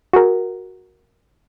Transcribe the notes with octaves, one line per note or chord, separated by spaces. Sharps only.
F#4 G#4 A#4